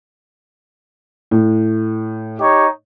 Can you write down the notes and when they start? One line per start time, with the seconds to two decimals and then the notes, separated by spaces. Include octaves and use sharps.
1.31 A2
2.40 D#4 G4 C#5